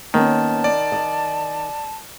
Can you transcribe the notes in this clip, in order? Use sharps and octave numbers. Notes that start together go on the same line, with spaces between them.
D#3 A#3 B3 C#4 A5
D5
D#5